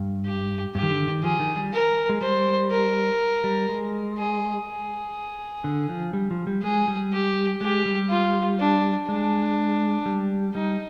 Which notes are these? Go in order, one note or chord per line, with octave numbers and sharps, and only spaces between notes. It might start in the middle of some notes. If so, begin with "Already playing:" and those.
Already playing: G2
G4
G2 G4
D#3
D3
D#3
F3 G#4
D#3
G3
A#4
G#3
G3 C5
A#4
G3
G#3
G#4
G#4
D3
F3
G3
F3
G3
G#3 G#4
G3
G4
G#3 G4
G3
F4
D4
G#3 D4
G3
G3 D#4